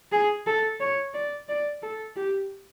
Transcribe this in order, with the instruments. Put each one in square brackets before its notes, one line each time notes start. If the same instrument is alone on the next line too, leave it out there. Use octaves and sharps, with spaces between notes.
[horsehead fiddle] G#4
A4
C#5
D5
D5
A4
G4